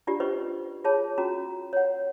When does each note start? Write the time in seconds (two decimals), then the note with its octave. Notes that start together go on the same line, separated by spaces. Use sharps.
0.07 D4 F4 G4 D5
0.20 C#4 B4 C5 D#5 C#6
0.84 F4 G#4 C#5 A5
1.18 C#4 F#4 A#5
1.73 C#5 F#5